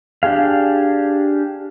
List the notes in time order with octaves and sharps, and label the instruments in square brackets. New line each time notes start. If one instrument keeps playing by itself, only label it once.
[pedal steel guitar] D4 G4 G#4 F5